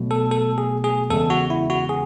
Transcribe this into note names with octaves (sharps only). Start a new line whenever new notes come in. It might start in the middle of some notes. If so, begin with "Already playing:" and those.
Already playing: B2 F#3 A3
A4
A4
G#4
G#4
E2 C#3 G#3 A4
F#4
E4
F#4
G#4